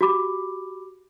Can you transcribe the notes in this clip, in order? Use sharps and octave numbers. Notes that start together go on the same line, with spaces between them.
F#4 G4 B5 D6